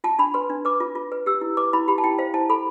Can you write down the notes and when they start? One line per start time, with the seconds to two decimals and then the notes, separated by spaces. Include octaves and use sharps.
0.04 F4 A5
0.19 D4 B5
0.34 B4 C6
0.50 D4
0.65 B4 D6
0.80 F4
0.95 F4
1.12 B4
1.26 G4 E6
1.41 E4
1.57 B4 D6
1.73 E4 B5
1.88 G4 B5
1.98 A5
2.04 E4 G5
2.19 C5 F5
2.34 E4 A5
2.49 A4 B5